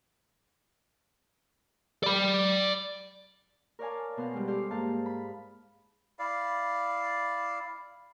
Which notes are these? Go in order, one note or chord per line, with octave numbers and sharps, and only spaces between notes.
D5 B5
A#4 C#5 D5 F5 G#5 A5
B2 B3 C5 F5
G3 G#3
G4 A4 C5 D5 F5
G#2 A#3 F5 A5
B5
E4 D5 F5